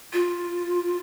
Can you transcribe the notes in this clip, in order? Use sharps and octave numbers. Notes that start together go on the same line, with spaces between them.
F4